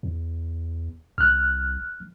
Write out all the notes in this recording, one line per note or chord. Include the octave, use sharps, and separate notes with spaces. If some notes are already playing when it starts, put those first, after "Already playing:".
E2
C2 F6 F#6